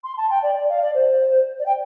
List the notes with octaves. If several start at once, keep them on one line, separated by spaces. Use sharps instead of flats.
C6
A5
G5
D5
D5
F5
D5
C5
D5
G5